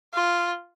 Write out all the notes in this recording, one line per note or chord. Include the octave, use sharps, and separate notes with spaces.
F4